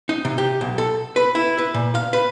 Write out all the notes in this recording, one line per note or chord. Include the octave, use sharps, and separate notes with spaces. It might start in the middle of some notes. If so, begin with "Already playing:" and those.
D#4
C3
G4
B1
A4
B4
E4
B4
A#2
F5
B4